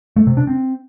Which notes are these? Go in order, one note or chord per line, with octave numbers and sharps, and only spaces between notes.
A3
C3
D4
C4